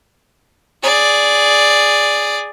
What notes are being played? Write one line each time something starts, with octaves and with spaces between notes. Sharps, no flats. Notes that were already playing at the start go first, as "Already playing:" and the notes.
G#4 D5